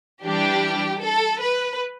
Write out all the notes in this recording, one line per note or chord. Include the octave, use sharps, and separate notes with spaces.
E3 G3 D4 G4
A4
B4